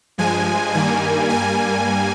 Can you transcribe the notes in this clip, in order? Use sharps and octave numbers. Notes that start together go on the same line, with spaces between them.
G2 F3 G#3 G#5
G2 D#3 G3 A#3 G#5
G2 G3 A#3 G#5